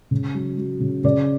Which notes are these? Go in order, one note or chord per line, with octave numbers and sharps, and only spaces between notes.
C#3
F#3
F#3
C#3
C#3 D5